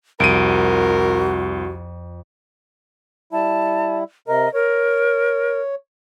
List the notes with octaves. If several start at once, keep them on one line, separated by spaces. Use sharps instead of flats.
C2 F2 F#4 A#4 D7 D#7
G3 E4 A5
C3 A#4 D#5
A#4 C#5